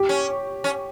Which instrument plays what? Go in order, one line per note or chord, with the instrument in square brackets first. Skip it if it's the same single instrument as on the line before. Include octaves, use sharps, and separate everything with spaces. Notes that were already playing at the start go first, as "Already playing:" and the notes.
Already playing: [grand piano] G4
[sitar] C#4
C#4